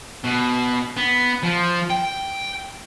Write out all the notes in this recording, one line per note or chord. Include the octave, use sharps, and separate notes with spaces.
B2
B3
F3
G5